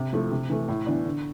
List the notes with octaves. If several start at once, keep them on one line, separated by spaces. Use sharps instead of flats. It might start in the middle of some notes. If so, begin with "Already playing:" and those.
Already playing: C3
F3 A3 E4
C3
E3 A3
A2
E3 B3 D4
D3